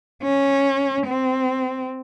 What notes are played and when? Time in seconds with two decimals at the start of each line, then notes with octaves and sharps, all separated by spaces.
0.23 C#4
1.06 C4